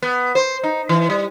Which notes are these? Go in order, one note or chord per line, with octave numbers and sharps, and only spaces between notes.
B3
C5
D#4
E3
G3